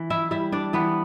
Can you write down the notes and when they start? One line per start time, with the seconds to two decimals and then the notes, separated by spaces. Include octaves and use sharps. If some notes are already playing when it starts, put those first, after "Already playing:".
Already playing: E3
0.10 E4 E5
0.31 G3 E4 E5
0.52 D4 D5
0.73 E3 B3 B4